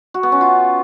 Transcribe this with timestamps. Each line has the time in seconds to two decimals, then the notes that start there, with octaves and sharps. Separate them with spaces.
0.14 F#4
0.23 B3
0.32 C#4
0.41 F4